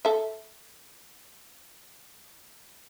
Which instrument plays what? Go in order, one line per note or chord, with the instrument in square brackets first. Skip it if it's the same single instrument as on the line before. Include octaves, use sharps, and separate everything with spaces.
[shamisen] A4 E5